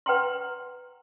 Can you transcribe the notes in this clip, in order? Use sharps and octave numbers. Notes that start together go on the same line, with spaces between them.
B4 F#5 G5 A#5 C6